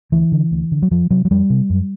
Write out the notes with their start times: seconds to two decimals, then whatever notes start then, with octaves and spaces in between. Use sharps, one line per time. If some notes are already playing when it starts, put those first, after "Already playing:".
0.12 D2 E3
0.32 D3
0.52 D2
0.72 D3
0.82 F#3
0.91 F2 F3
1.11 C3 F#3
1.25 F#3
1.31 F2 G3
1.50 C3
1.70 F#2